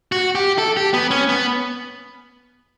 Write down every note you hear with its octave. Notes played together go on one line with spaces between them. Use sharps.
F#4
G4
A4
G4
B3
C#4
B3